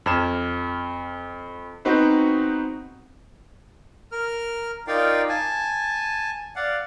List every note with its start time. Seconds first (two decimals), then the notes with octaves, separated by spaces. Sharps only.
0.06 F2 F6 G#6 E7
1.85 B3 C4 D#4 F#4 B4 C5
4.12 A#4 F6
4.87 D#4 F4 A#4 D5 F5 G5
5.29 G#5 A5
6.56 D5 F5 F#5